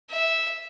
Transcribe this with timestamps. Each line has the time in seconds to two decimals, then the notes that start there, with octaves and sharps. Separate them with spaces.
0.10 E5